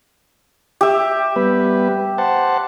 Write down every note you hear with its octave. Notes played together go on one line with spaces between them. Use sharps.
G4 E5
G3 B3 B4
C5 F#5 A5